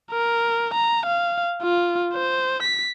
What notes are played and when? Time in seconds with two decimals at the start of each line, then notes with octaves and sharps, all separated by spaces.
0.11 A#4
0.74 A#5
1.06 F5
1.62 F4
2.13 C5
2.63 B6